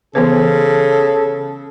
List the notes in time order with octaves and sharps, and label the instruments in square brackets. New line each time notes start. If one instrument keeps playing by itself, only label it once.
[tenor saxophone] C#3 [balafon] E3 B3 B4 [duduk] A4